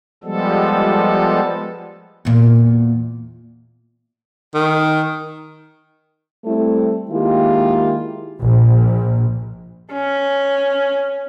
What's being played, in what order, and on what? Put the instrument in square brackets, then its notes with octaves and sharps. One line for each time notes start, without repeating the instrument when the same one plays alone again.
[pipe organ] F3 G3 G#3 B3 A4
[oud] E2 A#2
[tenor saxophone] D#3
[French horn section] G3 A3 C4 E4 A4
D#3 G#3 A#3 E4 F4 G4
[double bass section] A#1
[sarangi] C#4